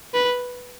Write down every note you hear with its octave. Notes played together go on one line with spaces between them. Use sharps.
B4